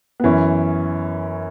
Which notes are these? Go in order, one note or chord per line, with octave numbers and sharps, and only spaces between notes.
B3
F#2 E3 C#4